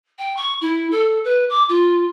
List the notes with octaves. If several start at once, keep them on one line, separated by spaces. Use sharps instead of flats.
G5
C#6
E4
A4
B4
D6
F4